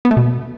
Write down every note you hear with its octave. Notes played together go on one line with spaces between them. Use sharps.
B3
A3
B2